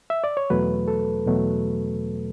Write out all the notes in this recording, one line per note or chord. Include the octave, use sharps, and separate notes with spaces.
E5
D5
C#5
E2 B2 F#3 A3 B4
A4
E2 B2 F#3 A3